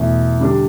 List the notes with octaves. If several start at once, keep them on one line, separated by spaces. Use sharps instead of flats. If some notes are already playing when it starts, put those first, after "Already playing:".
Already playing: E2 B2 A3
D3 G3 D4 G4